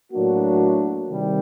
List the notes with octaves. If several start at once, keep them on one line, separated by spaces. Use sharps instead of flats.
A2 F#3 A#3 D4 F#4
C3 D#3 G3